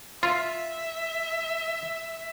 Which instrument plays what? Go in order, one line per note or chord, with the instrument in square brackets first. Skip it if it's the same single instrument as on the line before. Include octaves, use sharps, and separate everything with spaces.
[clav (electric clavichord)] F4 [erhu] E5